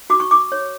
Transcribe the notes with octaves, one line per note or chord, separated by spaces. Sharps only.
F#4 D6
C#6
D6
C#5